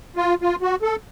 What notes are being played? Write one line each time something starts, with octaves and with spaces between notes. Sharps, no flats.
F4
F4
F#4
A4